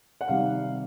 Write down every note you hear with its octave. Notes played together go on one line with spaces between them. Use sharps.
F#5
C3 D#3 G3 F5